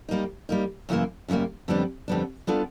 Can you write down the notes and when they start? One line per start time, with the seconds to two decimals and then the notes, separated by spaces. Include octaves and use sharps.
0.09 G3 A#3 D#4
0.49 G3 A#3 D#4
0.89 F#2 C#3 E3 G3 A#3
1.28 F#2 C#3 E3 G3 A#3
1.68 F2 D3 G3 B3 D4
2.08 F2 D3 G3 B3 D4
2.47 G3 B3 D4 F4 A4